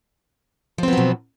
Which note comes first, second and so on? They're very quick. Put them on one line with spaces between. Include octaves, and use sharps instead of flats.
F3 C4 B3 F#3 B2